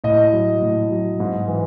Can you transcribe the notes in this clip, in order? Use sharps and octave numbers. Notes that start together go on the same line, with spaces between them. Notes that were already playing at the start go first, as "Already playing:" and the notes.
A2 D#5
F#3
A2
F#3
G#2
E3